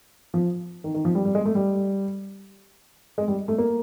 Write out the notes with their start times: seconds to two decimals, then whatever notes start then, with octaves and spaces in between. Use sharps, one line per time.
0.34 F3
0.84 D#3
0.94 D#3
1.05 F3
1.15 G3
1.25 G3
1.35 G#3
1.45 A3
1.55 G3
3.18 G#3
3.28 G3
3.48 A3
3.58 A#3